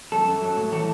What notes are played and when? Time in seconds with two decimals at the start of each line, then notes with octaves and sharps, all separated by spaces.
0.12 F#2 A4
0.28 F#2
0.42 F#3
0.57 A2
0.72 E3 A4